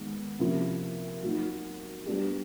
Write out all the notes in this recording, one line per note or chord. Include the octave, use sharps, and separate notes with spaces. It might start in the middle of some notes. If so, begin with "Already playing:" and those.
Already playing: D#3 G#3 B3
C3 F3 A#3 C#4 E4
F#3 A#3 D#4 F#4
G3 B3 D4 G4